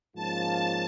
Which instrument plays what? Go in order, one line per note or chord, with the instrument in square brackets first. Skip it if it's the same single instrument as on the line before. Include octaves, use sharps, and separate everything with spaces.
[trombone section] G#2 F3 A#3 C#4 F4 [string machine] A5